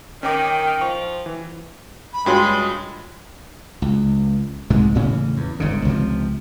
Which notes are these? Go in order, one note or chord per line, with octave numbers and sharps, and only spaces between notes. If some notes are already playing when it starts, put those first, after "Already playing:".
D#3 C#4 A#4 G5 D6
F3 C#6
E3
B5
G2 G#3 C#4 F4 F#4 C#5
C#2
C2 G#2 C3 G#3
A2 C#3 E3 C#4
E2
G1 G#2 C#3
C#2 C3 D#3 F3